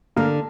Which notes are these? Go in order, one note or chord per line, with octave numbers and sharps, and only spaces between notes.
D3 A#3